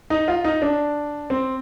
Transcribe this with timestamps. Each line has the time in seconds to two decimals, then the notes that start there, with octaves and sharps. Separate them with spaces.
0.10 D#4
0.28 F4
0.44 D#4
0.62 D4
1.30 C4